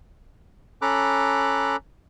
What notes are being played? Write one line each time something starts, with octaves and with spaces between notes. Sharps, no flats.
C#4 A4 A#5 B5 D6 F#6